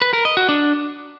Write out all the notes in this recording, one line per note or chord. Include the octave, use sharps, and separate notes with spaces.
B4
A#4
D#5
F#4
D4